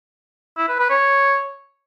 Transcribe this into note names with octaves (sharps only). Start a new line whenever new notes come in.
E4
B4
B4
C#5